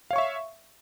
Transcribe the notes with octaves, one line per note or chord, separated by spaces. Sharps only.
C#5 E5 F5 C#6